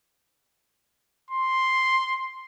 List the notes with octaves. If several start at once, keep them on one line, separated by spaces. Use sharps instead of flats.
C6